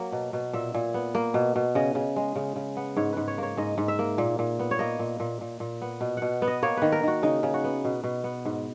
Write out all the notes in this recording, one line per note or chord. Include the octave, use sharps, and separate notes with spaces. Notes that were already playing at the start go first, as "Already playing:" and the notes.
Already playing: F#3 A#3
B2
B2
A#2 E5
A#2
B3
A#3
B2
B2
C#3 D#5
C#3
G#3
C#3
C#3
B3
G#2 C#5
G#2 B4
C#5
A#3 C#5
G#2 D#5
G#2
E5
A#3
A#2
A#2
B3
C#5
A#3 D#5
A#2
A#2
A#2
A#2
B3
B2
B2 F#5
B3
D#5
A#3 C#5
D#3 B4
A#4
D#3 F#4
C#3 D#4
C#3
F#4
B3
B2
B2
B3
G#2